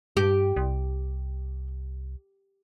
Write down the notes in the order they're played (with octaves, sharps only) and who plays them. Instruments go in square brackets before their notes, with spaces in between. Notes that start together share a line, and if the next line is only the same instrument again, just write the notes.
[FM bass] G2 [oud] G4
[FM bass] C2